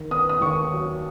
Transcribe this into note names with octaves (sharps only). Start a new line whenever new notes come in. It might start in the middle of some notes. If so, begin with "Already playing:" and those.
Already playing: D#3
B3 D#6
D#6
D#2 C#6
F#3